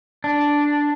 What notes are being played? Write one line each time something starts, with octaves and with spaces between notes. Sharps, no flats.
D4